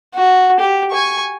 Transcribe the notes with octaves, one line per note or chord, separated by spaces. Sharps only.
F#4
G4
G#5 C#6